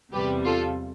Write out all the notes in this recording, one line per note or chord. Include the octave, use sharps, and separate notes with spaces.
E2 C3 G3 G4 B4
F4 A4